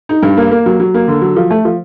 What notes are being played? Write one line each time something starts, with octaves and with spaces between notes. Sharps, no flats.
D#4
G2
A#3
A#3
F#3
F#3
A#3
D3
F#3
F3
A3
F3